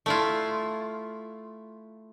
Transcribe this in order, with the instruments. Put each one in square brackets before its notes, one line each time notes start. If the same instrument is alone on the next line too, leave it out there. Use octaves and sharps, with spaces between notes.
[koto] A3 E4 F4